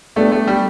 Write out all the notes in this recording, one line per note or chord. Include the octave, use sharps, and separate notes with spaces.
G3 A3 B3 D4 A4
A3
G3